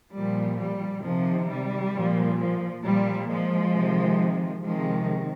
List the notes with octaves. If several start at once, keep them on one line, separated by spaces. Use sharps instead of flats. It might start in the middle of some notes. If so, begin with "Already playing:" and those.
A#2 F3 G3
G3
C3 D#3 F3
G3
A#2 F3
F3
A#2 F3 G3
F3 G#3
C3 D#3
C3 D#3 F3 G#3